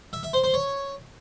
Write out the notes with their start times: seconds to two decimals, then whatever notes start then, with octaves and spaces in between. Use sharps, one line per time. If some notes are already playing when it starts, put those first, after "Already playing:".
0.13 E5
0.23 E5
0.33 C5
0.44 C5
0.54 C#5